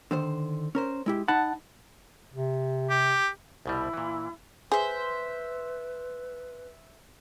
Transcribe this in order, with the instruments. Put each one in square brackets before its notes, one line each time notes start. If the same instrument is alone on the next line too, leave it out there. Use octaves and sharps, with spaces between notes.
[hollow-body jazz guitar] D3 D#3 C5
C#4 A#4 C5
G#3 E4 G4
[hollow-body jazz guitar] D#4 B5 [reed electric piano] F#5 A5
[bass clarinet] C3
[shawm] G4
[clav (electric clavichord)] C2 B2 G3 [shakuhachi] E4
[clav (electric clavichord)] A#2 E3
[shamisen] G#4 [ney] B4 [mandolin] C5 E5